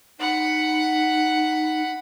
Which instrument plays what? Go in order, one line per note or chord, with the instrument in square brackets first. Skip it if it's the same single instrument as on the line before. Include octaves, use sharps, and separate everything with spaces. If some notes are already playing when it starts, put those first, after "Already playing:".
[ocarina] D#4 [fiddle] F#5 B5